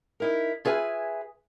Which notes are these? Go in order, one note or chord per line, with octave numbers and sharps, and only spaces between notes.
D#4 E4 A#4
F4 G#4 B4 E5 G#5